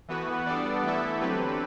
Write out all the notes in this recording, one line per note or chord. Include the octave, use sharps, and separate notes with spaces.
E3 A3 B3 F#4 B4
B3
G3 D4 A4 D5
E3 A3 E4 A4 E5
D3 F#3 C4 G4 A4 B4